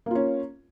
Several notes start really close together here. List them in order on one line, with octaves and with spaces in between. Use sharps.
A#3 F4 C#4